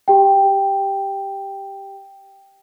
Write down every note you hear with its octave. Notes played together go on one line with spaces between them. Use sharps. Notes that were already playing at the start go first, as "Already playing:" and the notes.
G4 G5